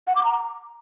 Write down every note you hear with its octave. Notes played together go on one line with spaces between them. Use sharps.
F#5
D6
A#5